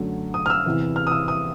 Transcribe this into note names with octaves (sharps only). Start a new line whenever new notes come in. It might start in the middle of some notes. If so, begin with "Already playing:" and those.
Already playing: F#2 D3 F#3 A3
D#6
F6
E6
E2 C3 E3
F6
D#6
E6
D#6